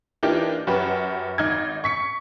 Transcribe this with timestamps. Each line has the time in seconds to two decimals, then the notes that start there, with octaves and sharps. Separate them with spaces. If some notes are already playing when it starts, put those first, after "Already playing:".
0.23 E3 A#3 D4 D#4 F4 G4
0.67 F#2 F#4 G4 B4
1.38 G#1 D#4 F6 G#6
1.84 C#6 B6 C#7